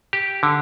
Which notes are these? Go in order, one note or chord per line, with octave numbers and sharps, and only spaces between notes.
G4
D3